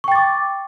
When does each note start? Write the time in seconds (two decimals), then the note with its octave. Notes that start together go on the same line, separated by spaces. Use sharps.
0.04 C#6
0.08 G5
0.12 A6
0.15 D6